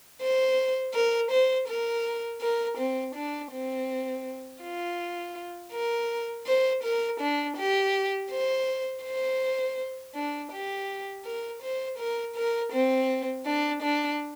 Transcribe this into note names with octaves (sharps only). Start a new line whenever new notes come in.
C5
A#4
C5
A#4
A#4
C4
D4
C4
F4
A#4
C5
A#4
D4
G4
C5
C5
D4
G4
A#4
C5
A#4
A#4
C4
D4
D4